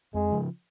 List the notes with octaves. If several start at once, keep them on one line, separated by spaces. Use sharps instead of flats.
F2 G#3
C#3 F3